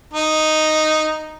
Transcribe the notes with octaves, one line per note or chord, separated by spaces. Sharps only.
D#4